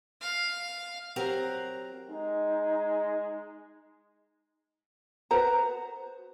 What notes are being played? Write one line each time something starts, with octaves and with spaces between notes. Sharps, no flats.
F5
F#3 C4 G4 A#4 F#5 A#5
G#3 D#4
F#4 B4 C5 A#5